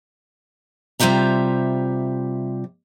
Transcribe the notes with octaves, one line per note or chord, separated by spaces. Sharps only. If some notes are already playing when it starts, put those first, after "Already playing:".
C3 G3 F4 C5 E5 A#5